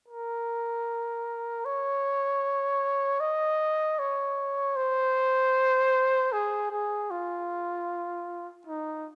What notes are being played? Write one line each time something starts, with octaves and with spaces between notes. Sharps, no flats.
A#4
C#5
D#5
C#5
C5
G#4
G#4
F4
D#4